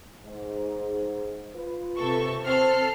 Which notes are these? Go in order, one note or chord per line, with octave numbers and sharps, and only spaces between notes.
G#2
F4 B4
C3 A4 C#6
C4 A4 F6 C7